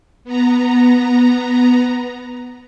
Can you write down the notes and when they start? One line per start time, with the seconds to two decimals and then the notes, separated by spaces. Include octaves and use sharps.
0.24 B3 A#5